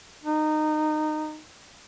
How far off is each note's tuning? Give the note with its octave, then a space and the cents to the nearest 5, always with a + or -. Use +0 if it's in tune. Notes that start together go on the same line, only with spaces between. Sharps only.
D#4 -20